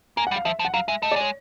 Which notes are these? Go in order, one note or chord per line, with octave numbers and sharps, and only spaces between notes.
A#3 G#5
F#5
G3
F5
F3 E5
F3
F#5
F#3 F5
G#3 E5
A3 D#5
D5
G#3 C#5